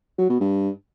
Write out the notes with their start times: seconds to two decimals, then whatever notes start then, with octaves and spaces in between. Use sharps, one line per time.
0.19 F#3
0.30 B2
0.41 G2